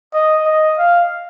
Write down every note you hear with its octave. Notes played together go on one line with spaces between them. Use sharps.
D#5
D#5
F5